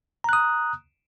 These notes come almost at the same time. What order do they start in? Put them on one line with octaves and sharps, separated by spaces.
A#5 F#6 D#6